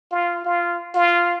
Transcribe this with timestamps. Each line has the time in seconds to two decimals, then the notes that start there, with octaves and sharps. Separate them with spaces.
0.11 F4
0.45 F4
0.95 F4